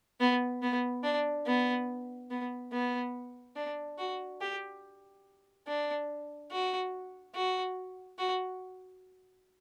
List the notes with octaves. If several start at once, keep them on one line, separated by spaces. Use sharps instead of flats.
B3
B3
D4
B3
B3
B3
D4
F#4
G4
D4
F#4
F#4
F#4